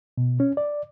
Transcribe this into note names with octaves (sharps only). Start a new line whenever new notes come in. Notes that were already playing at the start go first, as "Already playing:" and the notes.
B2
C#4
D5